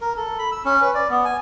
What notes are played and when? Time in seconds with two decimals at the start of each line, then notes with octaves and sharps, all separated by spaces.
0.01 A#4
0.17 A4
0.38 B5
0.52 E6
0.65 C#4
0.81 B4
0.94 D5
1.10 B3
1.25 G#5